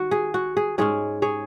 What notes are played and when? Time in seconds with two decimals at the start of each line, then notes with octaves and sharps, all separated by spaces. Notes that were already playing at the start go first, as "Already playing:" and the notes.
Already playing: D#3 F#4
0.11 G#4
0.34 F#4
0.57 G#4
0.78 G#2 G#3 C#4 G#4 C#5
1.22 G#4 C#5